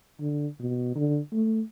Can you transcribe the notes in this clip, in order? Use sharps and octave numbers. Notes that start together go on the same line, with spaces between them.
D3
B2
D3
A3